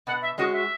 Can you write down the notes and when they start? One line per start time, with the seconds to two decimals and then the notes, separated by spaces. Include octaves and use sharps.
0.07 B2 F#5
0.22 E5
0.37 G#3 C#4 F#4 D#5
0.52 E5